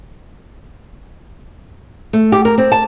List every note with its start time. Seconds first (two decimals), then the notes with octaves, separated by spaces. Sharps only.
2.13 A3
2.32 G4
2.45 A#4
2.58 C4
2.72 A5